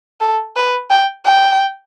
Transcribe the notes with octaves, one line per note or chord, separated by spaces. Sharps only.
A4
B4
G5
G5